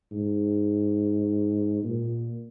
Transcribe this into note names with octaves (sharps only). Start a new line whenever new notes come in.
G#2
A#2